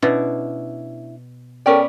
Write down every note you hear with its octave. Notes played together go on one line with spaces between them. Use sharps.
B2 C#4 D4 E4
B3 C#4 A4 A#4 D5 G5